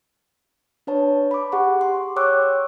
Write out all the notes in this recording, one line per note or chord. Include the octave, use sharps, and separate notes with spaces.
D4 B4 C#5 A5
B5 D6
G4 G#4 F#5 C#6 D6
C6
C#5 G5 C#6 D6 E6 F#6